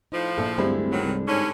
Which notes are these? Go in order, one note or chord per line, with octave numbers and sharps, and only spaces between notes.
A2 F3 D#4
A#1 A4
D1 G2 G#3 A3 C4 E4
D#3 F#3
C2
G#2 D3 C#4